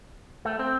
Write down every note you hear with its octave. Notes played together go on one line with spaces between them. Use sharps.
A3
C4